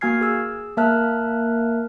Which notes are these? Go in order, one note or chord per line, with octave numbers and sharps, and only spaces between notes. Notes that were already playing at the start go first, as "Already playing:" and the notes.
A#3 F#4 G#5 F6 G#6 C7
G#4 E6
A#3 A#4 E5 A5 F6 F#6